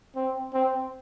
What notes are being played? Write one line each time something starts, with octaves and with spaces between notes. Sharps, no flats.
C4
C4